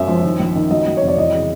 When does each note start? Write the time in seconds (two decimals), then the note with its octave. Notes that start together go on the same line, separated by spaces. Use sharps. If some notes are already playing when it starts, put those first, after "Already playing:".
Already playing: F#2 E5
0.08 F3
0.24 D#3
0.40 A#1
0.55 D#3
0.71 F#3 D#5
0.86 F#3
0.97 F1 C#5
1.08 D5
1.17 E3 D#5
1.34 C#3